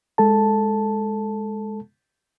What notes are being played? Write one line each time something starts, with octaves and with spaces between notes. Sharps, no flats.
G#3 A4 A5